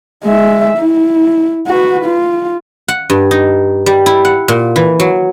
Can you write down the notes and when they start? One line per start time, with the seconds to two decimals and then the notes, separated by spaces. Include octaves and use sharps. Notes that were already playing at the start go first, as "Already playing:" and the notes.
0.24 G#3 E5
0.78 E4
1.67 F#4 B4
2.06 F4
2.88 F#5
3.10 G2
3.31 D#4
3.86 G3
4.06 E4
4.25 F#5
4.48 A#2
4.76 E3
5.00 F#3